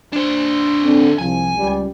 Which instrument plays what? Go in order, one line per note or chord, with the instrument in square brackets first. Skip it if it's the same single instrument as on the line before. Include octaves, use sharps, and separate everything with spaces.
[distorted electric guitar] D4 C5
[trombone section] D3 C4
[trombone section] C2 F3 [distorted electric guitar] G#5
[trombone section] C#2 G3